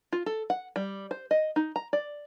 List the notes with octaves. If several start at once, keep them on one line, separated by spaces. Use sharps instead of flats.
F4
A4
F#5
G3
C5
D#5
D#4
A#5
D5